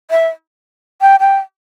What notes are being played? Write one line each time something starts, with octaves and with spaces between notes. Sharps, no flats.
E5
G5
G5